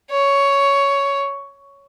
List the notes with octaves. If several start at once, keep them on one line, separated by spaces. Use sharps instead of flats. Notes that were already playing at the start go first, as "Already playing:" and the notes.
C#5